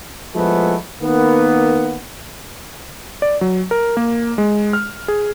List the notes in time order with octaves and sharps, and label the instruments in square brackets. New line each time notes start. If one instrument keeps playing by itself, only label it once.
[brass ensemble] F3 G#3 A3 B3 E4
D#3 A#3 B3
[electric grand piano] D5
F#3
A#4
A#3
G#3
F6
G#4